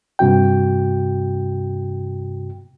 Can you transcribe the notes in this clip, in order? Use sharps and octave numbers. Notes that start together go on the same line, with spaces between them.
G2 C3 F#4 G5